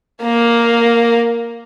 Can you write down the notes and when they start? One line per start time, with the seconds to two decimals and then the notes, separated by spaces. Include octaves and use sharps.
0.23 A#3 A#4